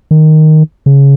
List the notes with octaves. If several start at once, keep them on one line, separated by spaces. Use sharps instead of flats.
D#3
C#3